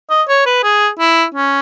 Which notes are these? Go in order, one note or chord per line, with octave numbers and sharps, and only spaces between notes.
D#5
C#5
B4
G#4
E4
C#4